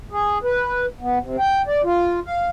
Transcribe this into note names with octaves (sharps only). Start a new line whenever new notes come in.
G#4
B4
B3
C3
G5
D5
F4
F5